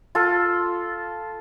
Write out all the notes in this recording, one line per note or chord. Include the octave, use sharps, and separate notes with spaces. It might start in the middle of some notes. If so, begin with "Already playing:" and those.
F4 A4